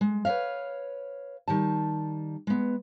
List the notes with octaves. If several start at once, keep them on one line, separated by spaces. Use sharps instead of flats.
G#3
B4 C#5 D5 E5 F5
D#3 G3 A5
G#3 B3